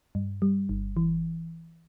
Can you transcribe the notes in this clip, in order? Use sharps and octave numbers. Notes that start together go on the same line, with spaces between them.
G2
G3
G1
E3